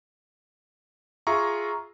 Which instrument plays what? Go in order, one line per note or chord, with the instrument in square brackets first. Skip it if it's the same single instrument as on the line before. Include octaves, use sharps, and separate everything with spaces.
[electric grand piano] F4 G#4 E5 A#5 C#6